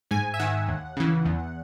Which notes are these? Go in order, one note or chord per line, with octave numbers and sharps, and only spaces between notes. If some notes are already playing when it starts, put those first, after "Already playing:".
G#2 G#5
E5
D#3 F#5
D#2
C#3 E3
E2